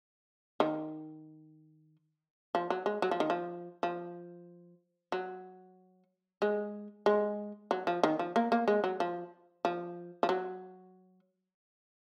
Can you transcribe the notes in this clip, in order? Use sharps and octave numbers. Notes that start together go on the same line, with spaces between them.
D#3
F3
F#3
G#3
F#3
F3
D#3
F3
F3
F#3
G#3
G#3
F#3
F3
D#3
F3
A#3
A#3
G#3
F#3
F3
F3
F3
F#3